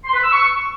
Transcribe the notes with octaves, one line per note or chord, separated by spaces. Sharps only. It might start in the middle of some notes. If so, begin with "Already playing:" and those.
C6
B4
E6
C#6